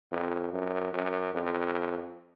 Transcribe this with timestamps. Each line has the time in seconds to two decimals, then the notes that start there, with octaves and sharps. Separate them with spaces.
0.11 F2
0.52 F#2
0.93 F#2
1.34 F2